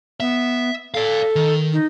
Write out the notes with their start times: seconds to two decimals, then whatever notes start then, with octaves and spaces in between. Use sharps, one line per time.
0.20 B3 E5
0.94 A4 D5 F5
1.36 D#3
1.73 D#4